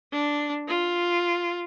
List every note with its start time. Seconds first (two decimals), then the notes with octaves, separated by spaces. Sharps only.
0.12 D4
0.68 F4